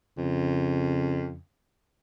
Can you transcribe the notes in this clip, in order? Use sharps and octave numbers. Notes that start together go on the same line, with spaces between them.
F2 C#3